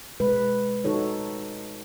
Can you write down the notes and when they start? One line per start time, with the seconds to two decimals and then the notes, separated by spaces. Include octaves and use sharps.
0.20 B2 G#3 B4
0.85 D#4 F#4 A4 C#5